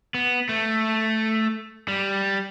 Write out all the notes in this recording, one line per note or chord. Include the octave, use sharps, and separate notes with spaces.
B3
A3
G3